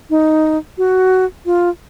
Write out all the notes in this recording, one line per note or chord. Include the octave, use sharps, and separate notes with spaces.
D#4
F#4
F4